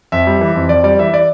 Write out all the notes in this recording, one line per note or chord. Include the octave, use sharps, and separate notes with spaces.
F2 E5
G3
E3
F2
F2 D5
G3 D5
E3 E5
D5